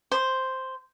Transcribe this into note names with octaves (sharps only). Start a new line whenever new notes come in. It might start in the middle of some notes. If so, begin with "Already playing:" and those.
C5